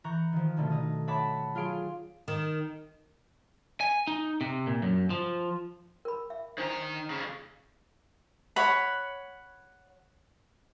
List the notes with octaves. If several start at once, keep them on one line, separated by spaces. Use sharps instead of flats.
E3 A#5 C#6 F#6 G6
D#3 F3
B2 D3 D#3 A3
D#4 D#5
C#5 E5 F#5 A5 B5 D6
F#3 F4 G#4 F5 C6 D7
D#3
G#5
D#4
C3
A#2
F#2
F3
A#4 B5
E5
D#3 D4 C5 A#5
F2 C#3
C#5 F#5 B5